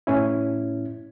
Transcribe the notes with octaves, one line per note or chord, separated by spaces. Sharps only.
A2 C#4 E4